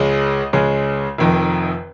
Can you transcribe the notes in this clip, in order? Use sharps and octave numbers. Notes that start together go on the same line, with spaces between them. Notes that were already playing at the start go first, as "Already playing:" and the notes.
Already playing: C#2 C#3 G#3 D#5
C#2 C#3 G#3
F1 F2 D#3